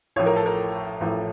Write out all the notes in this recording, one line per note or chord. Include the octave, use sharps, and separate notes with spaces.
A1 A2 F3 C#5
A#4
A4
A#4
A1 A2 F3